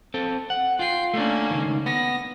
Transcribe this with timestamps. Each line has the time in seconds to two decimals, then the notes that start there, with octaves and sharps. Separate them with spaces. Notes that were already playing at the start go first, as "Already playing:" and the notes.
0.14 C4 A4
0.50 F#5
0.79 F4 G5 C7
1.14 A3 A#3 C#4 D4
1.51 C#2 G2 D#3
1.86 B3 A#6